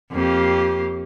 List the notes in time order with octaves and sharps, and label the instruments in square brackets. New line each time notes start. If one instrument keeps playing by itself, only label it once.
[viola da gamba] F2 A#3 G4